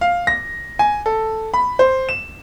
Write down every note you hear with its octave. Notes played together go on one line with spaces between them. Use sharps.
F5
A#6
G#5
A4
B5
C5
E7